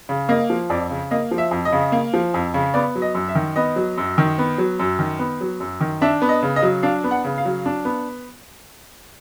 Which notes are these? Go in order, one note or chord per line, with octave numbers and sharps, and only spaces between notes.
C#3
A#3 D#5
F3
F2 D5
C#3
A#3 D#5
F3
E5
F2
D#5
C#3
A#3
F3
F2
C#3
B3 D5
F#3
D#5
F#2
E5
D#3
B3 D#5
F#3
F#2
D#3
B3
F#3
F#2
D#3
B3
F#3
F#2
D#3
D4 E5
B3
D#5
C#3
D#5
F#3
D4 F5
B3
F#5
C#3
F5
F#3
D4
B3